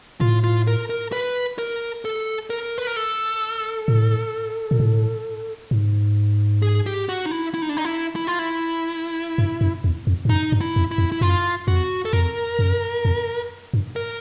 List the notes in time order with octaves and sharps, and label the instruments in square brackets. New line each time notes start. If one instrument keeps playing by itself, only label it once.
[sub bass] A2 [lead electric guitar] F4
[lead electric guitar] F4
A#4
A#4
B4
A#4
A4
A#4
B4
A#4
A4
[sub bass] A2
A#2
A2
G#2
[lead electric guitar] G#4
G4
F#4
D#4
E4
E4
D#4
D4
D#4
E4
E4
F4
E4
[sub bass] G2
F#2
E2
F2
G2
[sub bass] F#2 [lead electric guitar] D#4
[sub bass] G2
[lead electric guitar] E4
[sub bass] F2
[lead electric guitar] E4
[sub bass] F2
[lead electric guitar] E4
[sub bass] F#2 [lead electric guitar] F4
[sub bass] F2 [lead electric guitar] F#4
[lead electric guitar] A4
[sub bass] F2 [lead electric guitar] A#4
[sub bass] F#2
F2
G2
[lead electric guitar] A#4